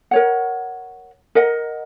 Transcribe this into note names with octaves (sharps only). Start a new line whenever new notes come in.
A#4 C#5 F#5
A#4 D#5 F#5